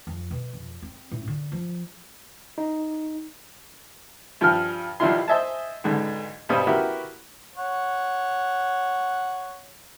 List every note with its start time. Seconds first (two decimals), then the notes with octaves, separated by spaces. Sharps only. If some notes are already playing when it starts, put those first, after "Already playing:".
0.07 F2
0.31 B2
0.53 F2
0.82 C4
1.11 A2
1.27 D3
1.52 F3
2.58 D#4
4.41 G2 F3 G5 G#5 F6
5.00 B1 F3 G3 E4 F4 C6
5.28 C5 D#5 E5 G#5 A5
5.84 B1 G#2 D3
6.49 G2 B2 G3 C5 D#6
6.67 B3 E4 F#4 G4 A#4
7.56 C#5 F#5